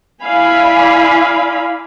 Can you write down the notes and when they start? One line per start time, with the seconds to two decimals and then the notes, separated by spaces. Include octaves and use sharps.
0.23 E4 D5 F5 G#5 B5